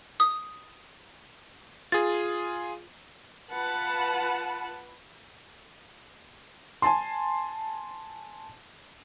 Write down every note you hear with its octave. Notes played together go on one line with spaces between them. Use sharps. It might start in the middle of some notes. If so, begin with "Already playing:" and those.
D#6
F4 G#4 A6
F4 B4 F#5 A5 B5
G#5 A5 C6